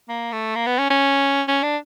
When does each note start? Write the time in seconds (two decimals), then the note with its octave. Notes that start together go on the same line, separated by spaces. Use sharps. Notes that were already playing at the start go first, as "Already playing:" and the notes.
0.09 A#3
0.32 A3
0.55 A#3
0.66 B3
0.78 C#4
0.90 C#4
1.48 C#4
1.63 D4